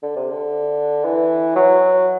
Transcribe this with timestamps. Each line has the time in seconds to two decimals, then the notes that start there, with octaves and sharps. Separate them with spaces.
0.03 D3
0.16 C3
0.30 D3
1.05 E3
1.56 F#3